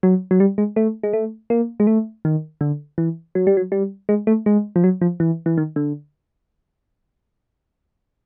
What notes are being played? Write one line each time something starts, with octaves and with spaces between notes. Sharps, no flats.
F#3
F#3
G3
G#3
A3
G#3
A3
A#3
G#3
A3
D#3
D3
E3
F#3
G3
F#3
G3
G#3
A3
G#3
F3
F#3
F3
E3
E3
D#3
D3